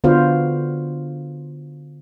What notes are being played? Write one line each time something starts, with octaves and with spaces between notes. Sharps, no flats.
D3 B3 F4 F#4 C5 F5